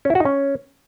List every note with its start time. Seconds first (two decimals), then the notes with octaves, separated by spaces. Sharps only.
0.05 C#4
0.10 E4
0.15 F#4
0.20 D#4
0.25 C#4